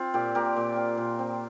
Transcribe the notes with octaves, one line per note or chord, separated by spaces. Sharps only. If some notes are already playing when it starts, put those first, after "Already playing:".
Already playing: C4 F4
A#2 G4
A#2 G4 A#4
A#2
C4
A#2
C4